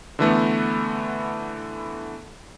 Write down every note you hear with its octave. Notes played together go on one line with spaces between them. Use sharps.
D3 E3 A3 B3